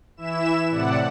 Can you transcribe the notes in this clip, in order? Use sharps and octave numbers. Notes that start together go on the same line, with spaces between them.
E3 E4 E5 E7
A2 C3 D5 F#5